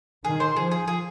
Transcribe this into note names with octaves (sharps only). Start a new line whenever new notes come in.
D#3 G#4
C5
F3 G#4
G#4
G#4